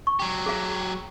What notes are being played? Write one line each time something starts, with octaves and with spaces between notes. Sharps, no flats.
C#6
F#3 G4
G#4 F5